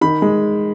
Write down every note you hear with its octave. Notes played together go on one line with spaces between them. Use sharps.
D#3 B5
G#3